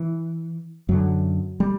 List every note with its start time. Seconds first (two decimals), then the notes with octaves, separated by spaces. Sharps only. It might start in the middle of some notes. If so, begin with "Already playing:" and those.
Already playing: E3
0.89 F#2 D3 F#3
1.60 G3